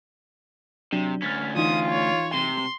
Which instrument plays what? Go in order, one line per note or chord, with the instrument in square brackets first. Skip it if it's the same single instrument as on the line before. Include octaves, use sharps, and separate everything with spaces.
[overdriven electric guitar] C3 [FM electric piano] F#3 D4
[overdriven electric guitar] D2 C#4 [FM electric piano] F6 A6 B6
[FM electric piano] E3 D#4 [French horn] F4 [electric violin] D#6
[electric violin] C#5
[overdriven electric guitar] C3 [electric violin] C6